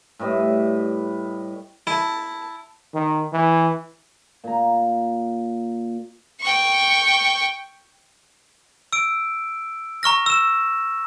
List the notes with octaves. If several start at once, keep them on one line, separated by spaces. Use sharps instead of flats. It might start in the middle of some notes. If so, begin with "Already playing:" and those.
A2 G3 B4 D#5
E4 A5
D#3
E3
A#2 A#5
G5 C#6
E6 D7
A#5 C#6 F6 A#6
E6 E7